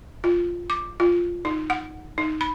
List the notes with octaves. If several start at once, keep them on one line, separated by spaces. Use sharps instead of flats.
F4
D6
F4
D#4
F#5
D#4
B5